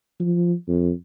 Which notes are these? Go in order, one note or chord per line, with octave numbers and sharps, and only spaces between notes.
F3
F2